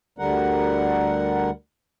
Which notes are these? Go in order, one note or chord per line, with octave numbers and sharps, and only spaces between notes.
D2 D3 G3 A#4 F#5